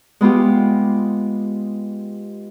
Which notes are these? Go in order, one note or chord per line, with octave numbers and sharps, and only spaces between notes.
G#3 B3 F4 G4